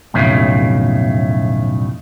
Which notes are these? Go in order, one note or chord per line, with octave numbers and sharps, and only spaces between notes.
B1 F2 A2 C#3